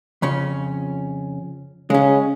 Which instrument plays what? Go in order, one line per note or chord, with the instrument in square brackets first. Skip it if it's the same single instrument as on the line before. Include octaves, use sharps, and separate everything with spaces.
[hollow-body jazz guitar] F2 C#3 C#4
[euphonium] C#3 [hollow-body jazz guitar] G#3 C#4